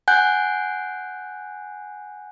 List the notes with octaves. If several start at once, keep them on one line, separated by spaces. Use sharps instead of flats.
F#5 G#5 F#6 G6